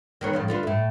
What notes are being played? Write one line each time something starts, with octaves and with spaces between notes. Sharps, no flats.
D#3 B3 C#5
A2 C#3 F3
D3 F4 B4
A2 E4